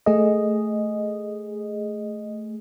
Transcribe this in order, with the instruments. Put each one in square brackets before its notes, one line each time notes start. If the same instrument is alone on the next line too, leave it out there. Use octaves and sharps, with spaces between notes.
[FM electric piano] A3 G#4 D#5